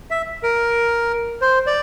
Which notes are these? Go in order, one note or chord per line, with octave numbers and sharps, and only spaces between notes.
E5
A#4
C5
D5